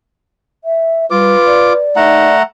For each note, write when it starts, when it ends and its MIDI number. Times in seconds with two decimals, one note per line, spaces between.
0.64 1.06 76
1.11 1.36 55
1.11 1.73 65
1.11 1.86 71
1.11 1.73 86
1.46 2.36 74
1.96 2.43 57
1.96 2.30 63
1.96 2.43 78
1.96 2.43 82